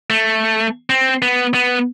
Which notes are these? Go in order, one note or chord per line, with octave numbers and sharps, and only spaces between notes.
A3
C4
B3
B3